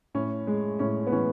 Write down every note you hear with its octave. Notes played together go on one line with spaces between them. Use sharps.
A2 C#4
G#3
A2 C#4
B3
E3 C#4